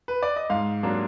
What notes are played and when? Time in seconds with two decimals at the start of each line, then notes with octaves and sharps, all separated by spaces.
0.08 B4
0.23 D5
0.36 D#5
0.50 G#2 F5
0.83 F#3 A#3 D4